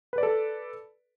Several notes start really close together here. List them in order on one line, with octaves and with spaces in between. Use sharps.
B4 D5 A4